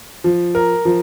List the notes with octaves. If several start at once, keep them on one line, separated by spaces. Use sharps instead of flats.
F3
A#4
F3